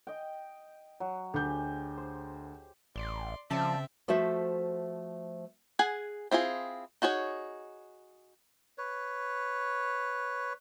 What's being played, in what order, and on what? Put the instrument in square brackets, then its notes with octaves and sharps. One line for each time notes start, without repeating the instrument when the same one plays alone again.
[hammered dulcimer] D#5 G5
F#3
[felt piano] D2 G6 [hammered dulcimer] G4 G#4
[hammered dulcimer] C5
[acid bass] A1 [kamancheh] D5 C6
[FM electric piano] C#3 [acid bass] F3 [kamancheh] C4 E5 [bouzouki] D5 A5
[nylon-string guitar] F3 A3 F#4 C5 E5
[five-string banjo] G#4 F#5 G#5
C4 E4 F4 G#4
D#4 F#4 G#4 C#5
[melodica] B4 C#5